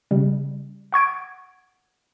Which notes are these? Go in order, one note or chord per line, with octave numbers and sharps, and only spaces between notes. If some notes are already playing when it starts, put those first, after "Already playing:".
C#3 G3
F#5 C#6 G#6 D7